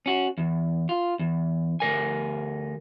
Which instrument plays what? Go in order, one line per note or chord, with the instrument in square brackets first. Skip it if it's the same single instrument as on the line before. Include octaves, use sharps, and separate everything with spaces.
[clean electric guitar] C#4 F#4
E2
F4
E2
D2 E3 A#4 G#5